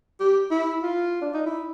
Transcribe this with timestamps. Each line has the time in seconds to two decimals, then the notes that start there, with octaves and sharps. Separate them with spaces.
0.20 G4
0.50 E4
0.82 F4
1.22 D4
1.34 D#4
1.46 E4